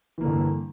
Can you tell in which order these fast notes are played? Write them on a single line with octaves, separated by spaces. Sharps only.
E3 A#3 D3 G2